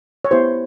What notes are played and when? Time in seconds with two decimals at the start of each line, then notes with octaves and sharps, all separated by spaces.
0.25 C#5
0.31 B3 E4 G4 C5